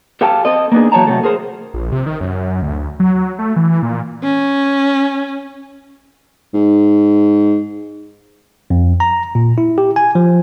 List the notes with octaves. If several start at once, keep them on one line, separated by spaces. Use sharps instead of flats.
G4 A4 F5 G5 A5
C4 A4 C5 D#5
A#3 B3 D4 D#4 G#4 A#4
E3 F#3 C#5 A5 A#5
C3 F#3 A3 A4
G#4 A#4 C5
A#1
C3
D#3
F#2
D2
F#3
A3
E3
A#2
C#4
G#2
F2
A#5
A#2
E4
G4
G#5
F3